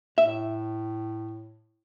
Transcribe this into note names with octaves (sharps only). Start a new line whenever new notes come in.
A2 E5